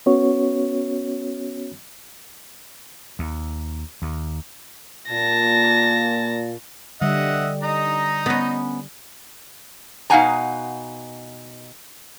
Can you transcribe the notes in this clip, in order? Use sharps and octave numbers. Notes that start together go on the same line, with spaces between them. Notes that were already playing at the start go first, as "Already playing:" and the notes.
B3 C#4 F#4 C#5
D#2
D#2
A#2 A5 A#6
D3 G3 D#5 E5 F#5
D#4 D#5 A#5
B3 C#4
B2 D#4 F5 F#5 G#5 A#5